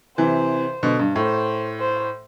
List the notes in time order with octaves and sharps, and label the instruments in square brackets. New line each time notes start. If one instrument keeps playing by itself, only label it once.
[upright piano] C3 E3 [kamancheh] C5
[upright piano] B2 D3
G2
[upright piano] A2 [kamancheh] C5
[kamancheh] C5